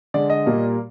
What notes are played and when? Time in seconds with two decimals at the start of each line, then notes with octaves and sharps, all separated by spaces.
0.14 D3 G#3 D5
0.30 D#5
0.46 A#2 G3 A#3